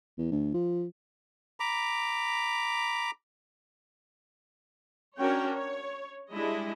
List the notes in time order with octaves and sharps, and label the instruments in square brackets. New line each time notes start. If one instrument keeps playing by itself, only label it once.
[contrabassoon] E2
D2
F3
[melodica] A#5 B5 D6
[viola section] C#4 D4 F#4 A#4 C#5 G5
C#5
G3 G#3 D4 E4 D#5